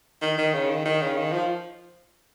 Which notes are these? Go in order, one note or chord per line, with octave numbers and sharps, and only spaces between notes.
D#3
D#3
C#3
D#3
D#3
C#3
D#3
F3